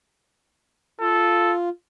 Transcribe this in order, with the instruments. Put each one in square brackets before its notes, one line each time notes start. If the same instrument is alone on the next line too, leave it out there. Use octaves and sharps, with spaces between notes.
[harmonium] F4 [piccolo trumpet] A4